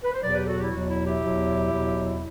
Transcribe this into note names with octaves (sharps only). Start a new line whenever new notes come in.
B4
C5
E2 B2 F#3 B4 D5
G4 B4
F#4 A4
E4 G4
E2 B2 F#3 F#4
E4
E4 G4
E2 B2 F#3
E2 B2 F#3